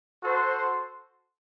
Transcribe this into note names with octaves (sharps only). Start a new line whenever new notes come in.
F#4 A4 C5